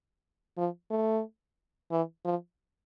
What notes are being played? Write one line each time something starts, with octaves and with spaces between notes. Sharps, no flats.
F3
A3
E3
F3